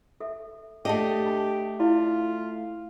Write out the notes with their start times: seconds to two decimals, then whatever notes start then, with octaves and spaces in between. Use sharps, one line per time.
0.20 A4 E5
0.85 A3 D4 G4 G#4 D#5 F#5
1.27 A5
1.80 E4 F4 D5